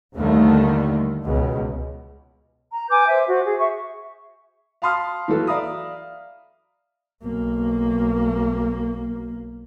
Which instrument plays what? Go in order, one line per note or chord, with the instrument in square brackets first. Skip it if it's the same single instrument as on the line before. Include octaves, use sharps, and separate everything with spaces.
[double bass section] D#2 D3 D#3 G3 A3
C#2 B2
[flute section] A#5
B4 G#5 D6 G6
C5 E5
F#4 C5
G#4
E5 C#6
[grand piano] F5 A5 B5 C6 D#6 F6
E3 F#3 A4 B4
D5 E5 F5 A#5 B5 D#6
[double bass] B1 A#3